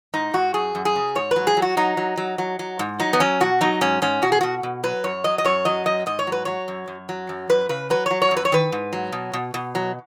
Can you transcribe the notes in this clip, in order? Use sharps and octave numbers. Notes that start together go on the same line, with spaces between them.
G#2 D#4
G#2 F#4
F#2 G#4
F#2
G#4
C#3
G#2 C#5
F#3 B4
G#4
F#3
F#4
F#3 D#4
F#3
F#3
F#3
F#3
G#2
F#3 D#4
B3
F#3 C#4
B2 F#4
F#3 D#4
G#2 C#4
G#2 C#4
B2 F#4
G#4
B2 F#4
B2
F#3 B4
F#2 C#5
F#3 D#5
D#5
F#2 C#5
F#3 D#5
F#2 D#5
G#2 D#5
C#5
F#3
B4
F#3 C#5
F#2
F#2
F#3
F#2
F#2 B4
C#3 B4
F#3 B4
F#3 C#5
C#5
F#2
B4
C#5
D#3 B4
G#2
F#3
B2
B2
B2
F#3